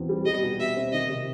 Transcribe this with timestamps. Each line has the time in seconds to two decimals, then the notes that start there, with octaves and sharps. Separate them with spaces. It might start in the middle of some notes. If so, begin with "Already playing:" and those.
Already playing: E2 B2 C4
0.09 G3
0.26 G3 D#5
0.43 B2
0.59 B2 E5
0.77 C4
0.92 D#3 D#5
1.10 C3